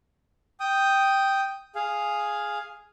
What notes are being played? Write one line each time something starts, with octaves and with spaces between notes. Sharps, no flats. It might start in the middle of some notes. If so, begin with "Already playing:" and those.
G5 D#6
G#4 F5